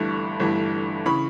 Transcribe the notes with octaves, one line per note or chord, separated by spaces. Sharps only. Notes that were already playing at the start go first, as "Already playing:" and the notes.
Already playing: G1 G2 E3 A3 C#6
G1 G2 E3 A3
C#3 E3 B5 C#6